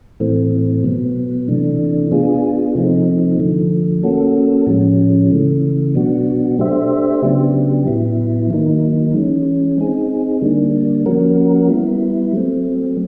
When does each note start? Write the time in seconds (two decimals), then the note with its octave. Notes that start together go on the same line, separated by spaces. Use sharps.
0.20 A2 E3 A3 C4
0.84 B2 F#3 B3
1.48 C3 E3 A3 D4
2.11 B3 D4 F4 G#4
2.75 C3 F3 A3 C4 D#4
3.40 D3 F3 A3
4.03 A#3 C#4 F#4 A4
4.67 A2 F3 G#3 C#4
5.31 C#3 E3 A3
5.95 B2 F#3 B3 D4 F#4
6.58 A3 D4 G4 C5 E5
7.22 C#3 F#3 B3 D4 G4
7.87 A2 F#3 B3 E4
8.50 D#3 F#3 A#3 D#4
9.14 E3 G#3 C#4
9.78 C4 D#4 G#4
10.42 D3 G3 A#3 D4
11.06 F3 A#3 C#4 F#4 A#4
11.69 G3 B3 E4
12.33 F#3 A3 C4